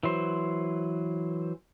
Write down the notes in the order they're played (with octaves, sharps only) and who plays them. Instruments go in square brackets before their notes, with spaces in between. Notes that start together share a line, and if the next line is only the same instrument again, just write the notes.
[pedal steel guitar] E3 F#3 C5